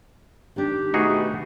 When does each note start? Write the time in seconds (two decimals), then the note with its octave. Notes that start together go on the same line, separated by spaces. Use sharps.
0.56 D#3 D4 G4
0.94 B2 A3 D#4 F#4 G#4